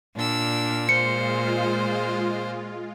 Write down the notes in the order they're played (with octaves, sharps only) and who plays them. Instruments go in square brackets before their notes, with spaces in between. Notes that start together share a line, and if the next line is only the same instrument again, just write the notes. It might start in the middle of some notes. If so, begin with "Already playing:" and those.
[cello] A#2 [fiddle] D4 E6
[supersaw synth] G#3 F4 [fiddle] C5 [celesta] C#7